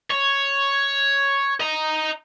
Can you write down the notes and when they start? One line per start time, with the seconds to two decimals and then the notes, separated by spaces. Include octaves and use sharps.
0.10 C#5
1.60 D#5 A#5